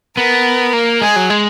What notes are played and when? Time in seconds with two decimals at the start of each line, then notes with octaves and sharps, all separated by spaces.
0.17 B3 A#4
0.73 A#3
1.01 G#3 G#4
1.16 F#3
1.30 G#3